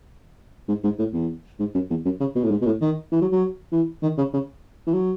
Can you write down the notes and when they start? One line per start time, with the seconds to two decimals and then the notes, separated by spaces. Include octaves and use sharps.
0.68 G#2
0.84 G#2
0.99 A2
1.13 E2
1.60 G#2
1.75 F#2
1.90 E2
2.05 F#2
2.20 C#3
2.36 B2
2.44 A2
2.51 G#2
2.62 B2
2.66 A2
2.81 D#3
3.12 E3
3.21 F#3
3.32 F#3
3.72 E3
4.03 D#3
4.18 C#3
4.34 C#3
4.87 E3
4.94 F#3